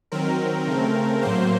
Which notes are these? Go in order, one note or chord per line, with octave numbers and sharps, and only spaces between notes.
D#3 F#3 C4 A#4
C#3 A3 C4
A2 F#3 A#3 C5